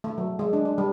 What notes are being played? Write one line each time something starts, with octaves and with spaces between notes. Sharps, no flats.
A3
F#3
G#3
D4
D4
G3